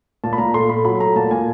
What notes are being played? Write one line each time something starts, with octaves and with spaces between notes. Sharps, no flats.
A#2 A5
B5
A#2 A#5
A3 C6
A3 B5
F#3 B5
A3 A#5
A#2 A5
A#2 G#5